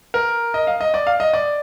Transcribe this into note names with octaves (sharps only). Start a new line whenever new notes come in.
A#4
D#5
F5
D#5
D5
F5
D#5
D5